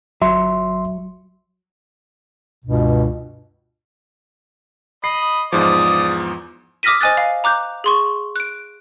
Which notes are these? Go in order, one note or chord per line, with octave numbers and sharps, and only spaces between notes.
G1 F#3 E5 C6
C#2 G2 B2
D#5 B5 C7
E2 G#2 F3 D5 D#6
D6 D#6 F6 A#6 B6 D#7
C5 D#5 G#5 D#6 F#6 A6
F5
A#5 D6 F#6 G6
G#4 C6 C#6
F#6 D7